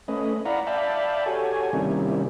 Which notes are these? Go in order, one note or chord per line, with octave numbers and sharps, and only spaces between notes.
A3 C#4 B4 D#5
E4 D5 F5 F#5 A#5 B5
D5 E5 F5 G5 A5 B5
F#4 G4 A4 C#5 G#5
C3 D#3 G3 A#3 C#4 E4